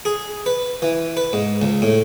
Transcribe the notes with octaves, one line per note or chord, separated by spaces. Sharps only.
G#4
B4
E3
B4
G#2
C#2
A2